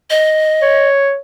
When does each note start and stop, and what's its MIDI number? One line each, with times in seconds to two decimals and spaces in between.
0.10 0.88 75
0.62 1.17 73